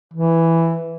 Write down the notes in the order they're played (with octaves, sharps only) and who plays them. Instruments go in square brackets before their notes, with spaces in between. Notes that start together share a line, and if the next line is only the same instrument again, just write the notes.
[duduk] E3